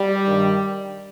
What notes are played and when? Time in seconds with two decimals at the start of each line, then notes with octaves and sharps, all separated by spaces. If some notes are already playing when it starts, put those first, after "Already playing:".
Already playing: G3
0.25 G2 D#3